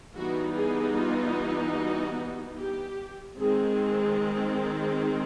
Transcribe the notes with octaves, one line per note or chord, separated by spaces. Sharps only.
E3 G3 B3 D#4 F#4
G#4
F4
F#4
G4
D#3 G#3 C4 G#4